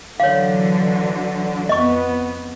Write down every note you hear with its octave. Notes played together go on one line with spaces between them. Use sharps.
D3 E3 F#3 C#5 F5
F2 B3 D#5 C#6